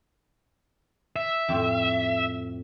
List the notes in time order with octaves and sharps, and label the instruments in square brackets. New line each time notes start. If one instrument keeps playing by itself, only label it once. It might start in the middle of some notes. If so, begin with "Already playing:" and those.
[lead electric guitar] E5
[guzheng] F2 A2